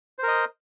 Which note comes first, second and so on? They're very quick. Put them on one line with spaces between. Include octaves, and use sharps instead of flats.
C5 A#4 D#5